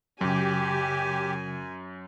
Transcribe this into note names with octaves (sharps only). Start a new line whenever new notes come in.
F#2 C#3 F#3 G4 G#5